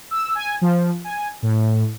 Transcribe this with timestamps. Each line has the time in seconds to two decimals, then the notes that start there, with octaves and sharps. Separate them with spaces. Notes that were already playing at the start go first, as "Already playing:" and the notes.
0.11 E6
0.35 G#5
0.61 F3
1.04 G#5
1.42 A2